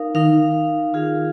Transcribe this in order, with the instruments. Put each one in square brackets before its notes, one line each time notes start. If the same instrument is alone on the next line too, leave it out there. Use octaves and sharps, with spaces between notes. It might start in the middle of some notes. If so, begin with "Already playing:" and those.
Already playing: [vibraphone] D#4 A#4 F5
[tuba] D#3 [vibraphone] D#4 A#4 F5
[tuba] D#3 [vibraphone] F4 G#4 F5